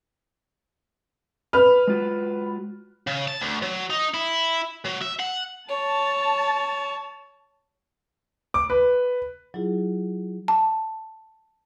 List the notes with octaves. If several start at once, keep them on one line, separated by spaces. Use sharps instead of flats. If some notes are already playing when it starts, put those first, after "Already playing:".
B4 F6
G#3 F4 F#4
C#3
A5
D2
F#3
D#4
E4
F#3
E5
F#5
C#5 A5
D6
B4
F#3 E4 F4 G#4
A5